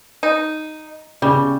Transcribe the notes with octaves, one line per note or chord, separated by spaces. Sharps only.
D#4
C#3 G3